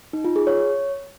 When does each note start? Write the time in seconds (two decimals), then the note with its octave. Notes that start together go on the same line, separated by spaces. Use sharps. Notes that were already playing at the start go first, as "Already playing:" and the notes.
0.13 D#4
0.25 F4
0.36 G#4
0.47 C#5